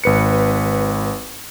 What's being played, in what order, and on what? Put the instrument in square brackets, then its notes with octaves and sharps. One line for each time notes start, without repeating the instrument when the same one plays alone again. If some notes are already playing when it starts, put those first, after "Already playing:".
[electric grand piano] G#1 B4 C#7